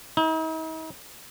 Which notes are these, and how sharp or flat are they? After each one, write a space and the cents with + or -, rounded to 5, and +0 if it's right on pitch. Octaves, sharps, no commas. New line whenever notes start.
D#4 +45